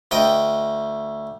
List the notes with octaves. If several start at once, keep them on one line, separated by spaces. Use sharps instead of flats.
D2 D#5 G5